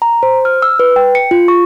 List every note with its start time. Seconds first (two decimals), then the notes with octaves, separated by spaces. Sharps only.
0.02 A#5
0.23 C5
0.45 F6
0.62 E6
0.79 B4
0.96 G5
1.15 C#7
1.31 F4
1.48 C#6